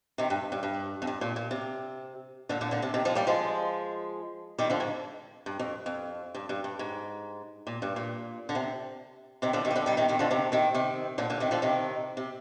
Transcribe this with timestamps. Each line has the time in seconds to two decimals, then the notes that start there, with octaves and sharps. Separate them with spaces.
0.18 C3 D#3
0.30 G2
0.52 G2
0.63 G2
1.02 F2
1.07 G2
1.21 A#2
1.36 A#2
1.51 C3
2.49 A#2 D3
2.61 A#2 D3
2.71 A#2 D3
2.82 C3
2.94 C3 D#3
3.05 F3 G#3
3.15 G3 A#3
3.27 F3 G#3
4.58 D#3 G3
4.70 D3 F3
4.80 G#2
5.46 G2
5.59 F2
5.86 F2
6.35 G2
6.49 G2
6.64 G2
6.79 G#2
7.67 A#2
7.82 G2
7.96 A#2
8.49 D3
8.55 C3
9.42 C3 D#3
9.53 D3 F3
9.65 C3 D#3
9.71 G3
9.76 D3 F3
9.86 D#3 G3
9.97 C3 D#3
10.09 C3 D#3
10.19 D3 F3
10.31 C3 D#3
10.52 C3 D#3
10.74 C3 D#3
11.18 A#2 D3
11.30 A#2 D3
11.40 C3 D#3
11.51 D3 F3
11.62 C3 D#3
12.17 C3